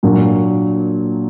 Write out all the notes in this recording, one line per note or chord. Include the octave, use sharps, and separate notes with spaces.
A#2 F#3 A#3 D4